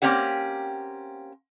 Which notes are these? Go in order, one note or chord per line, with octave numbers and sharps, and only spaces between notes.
A#3 C4 C#4 G4 F#5